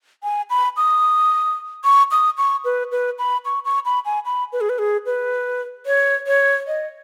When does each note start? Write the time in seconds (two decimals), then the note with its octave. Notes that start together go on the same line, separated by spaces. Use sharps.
0.23 G#5
0.50 B5
0.77 D#6
1.84 C#6
2.11 D#6
2.38 C#6
2.65 B4
2.92 B4
3.19 B5
3.45 C#6
3.65 C#6
3.85 B5
4.05 G#5
4.25 B5
4.53 B4
4.61 G#4
4.69 B4
4.79 G#4
5.06 B4
5.86 C#5
6.27 C#5
6.67 D#5